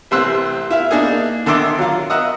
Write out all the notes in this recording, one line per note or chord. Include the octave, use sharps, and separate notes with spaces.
A1 C3 C5 E6 F#6
E4 E5 F5
A#3 D4 D#4 G#4
D3 D#3 E5 C6 D6
F#3 F4
D#5 E5 F#5 A#5